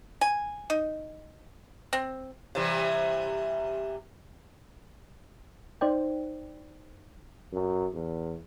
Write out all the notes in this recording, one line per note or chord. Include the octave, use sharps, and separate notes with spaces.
G#5
D#4
C4
C3 E3 G3
D#4 C5 D5 G5
F#2
E2